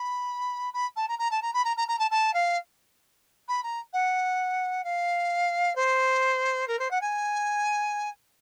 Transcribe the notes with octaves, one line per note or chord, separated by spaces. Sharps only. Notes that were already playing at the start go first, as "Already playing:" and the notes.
Already playing: B5
B5
A5
A#5
A#5
A5
A#5
B5
A#5
A#5
A#5
A5
A5
F5
B5
A#5
F#5
F5
C5
A#4
C5
F#5
G#5